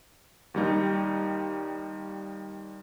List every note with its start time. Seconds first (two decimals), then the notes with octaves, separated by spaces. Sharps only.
0.54 D#2 G3 D#4